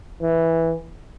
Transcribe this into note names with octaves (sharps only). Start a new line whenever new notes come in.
E3